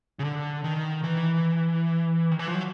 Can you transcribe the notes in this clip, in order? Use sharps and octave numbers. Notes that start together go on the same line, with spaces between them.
C#3
D3
D#3
E3
D#3
E3
F3
F#3